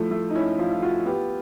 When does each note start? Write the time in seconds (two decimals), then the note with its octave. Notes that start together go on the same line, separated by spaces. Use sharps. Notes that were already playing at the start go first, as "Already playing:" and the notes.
Already playing: F3 A3 E4
0.11 A3
0.30 D#4
0.35 C#4 E4
0.59 F3 F4
0.71 F4
0.82 F4 F#4
1.06 B3 G4